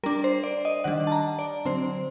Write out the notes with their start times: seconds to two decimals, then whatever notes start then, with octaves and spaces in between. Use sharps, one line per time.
0.03 G3 D4 A#4
0.24 C5
0.44 D5
0.65 D#5
0.84 D#3 G3 D4 F#5
1.07 A5
1.12 A#5
1.39 D5
1.65 D3 F#3 C4 C5